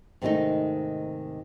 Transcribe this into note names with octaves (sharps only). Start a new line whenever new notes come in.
G#2 C3 D#3 G#3 A3 D#4